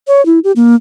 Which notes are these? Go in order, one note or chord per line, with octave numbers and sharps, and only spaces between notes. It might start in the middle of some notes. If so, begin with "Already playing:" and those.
C#5
E4
G4
A#3